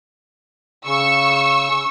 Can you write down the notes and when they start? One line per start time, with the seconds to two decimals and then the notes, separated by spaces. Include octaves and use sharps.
0.86 C#3 C#6 E6